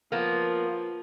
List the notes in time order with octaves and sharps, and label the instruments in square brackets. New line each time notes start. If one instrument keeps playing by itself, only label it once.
[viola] F3 [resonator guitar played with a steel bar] A#3 B3